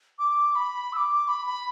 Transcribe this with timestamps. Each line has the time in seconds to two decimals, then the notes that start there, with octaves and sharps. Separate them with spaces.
0.19 D6
0.55 B5
0.93 E6
0.97 D6
1.28 B5
1.47 B5